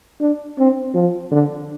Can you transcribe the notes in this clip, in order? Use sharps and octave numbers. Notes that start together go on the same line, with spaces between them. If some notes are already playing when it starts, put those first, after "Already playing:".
D4
C4
F3
D3